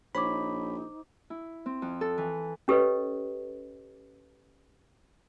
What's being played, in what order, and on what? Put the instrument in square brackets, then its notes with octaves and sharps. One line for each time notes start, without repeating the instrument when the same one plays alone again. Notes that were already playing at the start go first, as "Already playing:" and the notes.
[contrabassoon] A#1 [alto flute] D#4 [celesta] C5 D6 [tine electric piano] C#5 B5
[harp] E4
C4
F2
A4
E3
[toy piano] C#4 G4 A4 B4 C#5 D#5